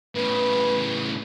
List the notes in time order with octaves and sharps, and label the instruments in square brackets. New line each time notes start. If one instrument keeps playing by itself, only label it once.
[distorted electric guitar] A2 C#3 [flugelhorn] B4